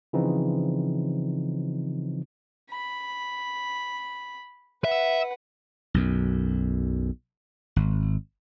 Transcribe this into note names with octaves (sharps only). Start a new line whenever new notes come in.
C#3 E3 F3 C4 D#4
B5
B4 E5 F#5
B1 F#2
G#1